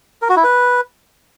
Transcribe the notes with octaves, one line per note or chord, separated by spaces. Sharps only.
A#4
F#4
E4
B4